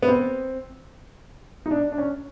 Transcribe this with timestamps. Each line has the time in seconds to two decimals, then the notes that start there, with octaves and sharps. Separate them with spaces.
0.02 B3
0.08 C4
1.66 D#4
1.71 D4
1.92 D4
1.98 C#4